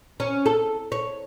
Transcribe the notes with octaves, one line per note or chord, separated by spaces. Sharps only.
C#4
A4
C#5